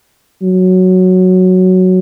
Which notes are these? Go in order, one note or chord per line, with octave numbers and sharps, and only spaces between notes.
F#3